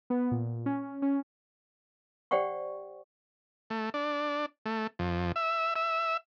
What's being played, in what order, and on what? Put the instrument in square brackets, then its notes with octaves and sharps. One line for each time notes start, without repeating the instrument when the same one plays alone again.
[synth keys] B3
A#2
C#4
C#4
[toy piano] G4 C5 D5 F#5 G5 C#6
[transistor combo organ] A3
D4
A3
F2
E5
E5